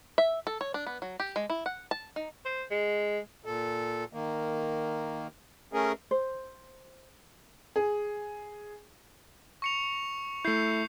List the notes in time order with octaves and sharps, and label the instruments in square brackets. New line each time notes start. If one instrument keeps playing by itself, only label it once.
[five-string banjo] E5
A4
C#5
D4
B3
F#3
G4
G#3
E4
F#5
A5
D#4
[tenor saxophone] C5
G#3
[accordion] A#2 A4
D#3 A#3
A3 C#4 G#4 A#4
[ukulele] C5
[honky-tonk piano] G#4
[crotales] C#6 C#7 F7
[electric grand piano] A3 E4 [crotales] G6 C7